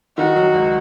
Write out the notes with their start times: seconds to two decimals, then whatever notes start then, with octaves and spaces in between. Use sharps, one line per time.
0.18 D#3 F#4
0.36 F#3
0.54 C#2